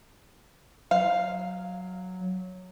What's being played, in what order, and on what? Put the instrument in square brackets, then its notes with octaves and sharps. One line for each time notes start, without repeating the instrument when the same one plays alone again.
[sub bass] F#3 [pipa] F5